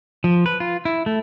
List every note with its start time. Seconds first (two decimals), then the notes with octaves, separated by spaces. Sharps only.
0.24 F3
0.46 B4
0.60 F4
0.85 E4
1.06 A3